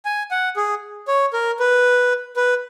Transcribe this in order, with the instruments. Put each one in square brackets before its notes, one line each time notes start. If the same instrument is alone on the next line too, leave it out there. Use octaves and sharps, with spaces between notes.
[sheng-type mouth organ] G#5
F#5
G#4
C#5
A#4
B4
B4